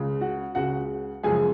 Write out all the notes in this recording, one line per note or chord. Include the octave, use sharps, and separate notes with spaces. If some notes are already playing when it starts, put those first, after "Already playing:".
Already playing: C#2 C#3 G#3
F#4 F#5
C#2 C#3 G#3 F#4 F#5
F#2 C#3 F3 G#3 G#4 G#5